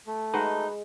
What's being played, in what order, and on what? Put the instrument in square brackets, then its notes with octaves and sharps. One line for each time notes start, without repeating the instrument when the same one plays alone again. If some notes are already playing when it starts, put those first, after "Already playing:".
[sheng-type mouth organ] A3
[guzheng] G#3 [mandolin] D#4 [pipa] F#4 B4